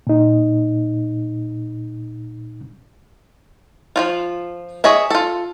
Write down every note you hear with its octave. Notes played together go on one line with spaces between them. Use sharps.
A#2 D#4
F3 F#3 F4
G#4 C#5 D#5 E5
F4 A4